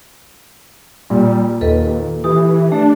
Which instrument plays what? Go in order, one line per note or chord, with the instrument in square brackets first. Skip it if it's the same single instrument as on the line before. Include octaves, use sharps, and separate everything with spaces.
[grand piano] A#2 [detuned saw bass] G3
[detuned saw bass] D#2 [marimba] A4 B4 D#5
[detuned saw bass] E3 [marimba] G4 D#6
[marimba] A3 [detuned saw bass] D4